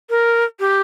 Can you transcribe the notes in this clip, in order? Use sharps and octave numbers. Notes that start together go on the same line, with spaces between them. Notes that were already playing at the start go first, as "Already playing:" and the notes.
A#4
G4